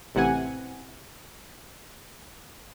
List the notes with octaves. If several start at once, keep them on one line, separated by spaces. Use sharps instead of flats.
A1 C3 E3 F#5 G#5